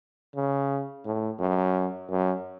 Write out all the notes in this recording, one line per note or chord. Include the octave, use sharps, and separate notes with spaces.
C#3
A2
F#2
F#2